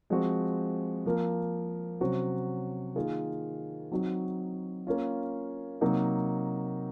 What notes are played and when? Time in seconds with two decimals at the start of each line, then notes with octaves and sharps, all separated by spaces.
0.10 F3 G#3 C4 F#4 C5
1.06 F3 A#3 F4 A#4
2.00 C3 F#3 C#4 F#4 C5
2.96 D#3 A#3 F4 G#4
3.91 F#3 C4 D#4 F#4
4.87 A#3 C#4 F4
5.81 C3 F#3 A#3 D#4